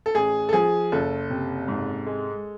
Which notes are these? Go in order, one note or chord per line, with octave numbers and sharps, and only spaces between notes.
A4
A1 G#4
A4
F3 G#4
F#1 A4
C3
G#2
G#3